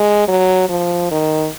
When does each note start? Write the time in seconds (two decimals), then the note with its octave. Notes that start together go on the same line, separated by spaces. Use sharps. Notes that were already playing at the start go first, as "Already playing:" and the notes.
Already playing: G#3
0.28 F#3
0.69 F3
1.11 D#3